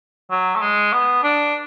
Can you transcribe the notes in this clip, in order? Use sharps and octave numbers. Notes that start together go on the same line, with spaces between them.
F#3
A3
G#3
B3
D4